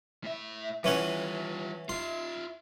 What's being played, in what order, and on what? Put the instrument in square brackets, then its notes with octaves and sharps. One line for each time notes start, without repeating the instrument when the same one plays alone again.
[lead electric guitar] A2 E5
[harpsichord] E3 C#4 F#5 [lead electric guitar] G3 F4
[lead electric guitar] F4 E5 [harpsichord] C6